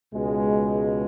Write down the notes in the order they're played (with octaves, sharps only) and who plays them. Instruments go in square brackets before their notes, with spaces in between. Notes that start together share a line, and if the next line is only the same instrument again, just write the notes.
[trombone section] C#2 B2 G#3